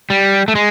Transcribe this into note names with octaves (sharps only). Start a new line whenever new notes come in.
G3
A3
G#3